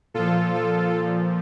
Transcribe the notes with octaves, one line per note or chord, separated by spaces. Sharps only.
A#2 F3 F4 A4
F4 A4
A#2 F3